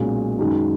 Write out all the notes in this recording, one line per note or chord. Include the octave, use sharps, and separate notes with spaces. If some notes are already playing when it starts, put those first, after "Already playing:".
Already playing: B1 A#2 G#3 C#4 F#4
F#2 D#3 G#3 D#4 F#4